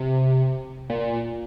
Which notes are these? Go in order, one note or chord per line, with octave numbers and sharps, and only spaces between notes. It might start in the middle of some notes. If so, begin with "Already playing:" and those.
Already playing: C3
A#2